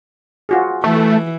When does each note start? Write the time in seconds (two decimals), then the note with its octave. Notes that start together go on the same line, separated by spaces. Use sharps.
0.49 F4 F#4 G#4
0.84 E3 A3